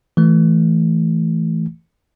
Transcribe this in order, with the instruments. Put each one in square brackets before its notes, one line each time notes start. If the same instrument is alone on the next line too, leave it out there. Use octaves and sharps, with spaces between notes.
[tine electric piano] E3 A3